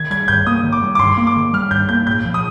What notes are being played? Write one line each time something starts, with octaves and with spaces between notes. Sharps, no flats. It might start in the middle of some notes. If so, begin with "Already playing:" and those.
Already playing: D#3 G#6
G3 G#6
G2 G6
A#3 D#6
D#3
D6
G3
D6
G2 C6
A#3
D6
D#3
G3 F6
G2 G6
A#3 G6
A#2 G6
F3
D#6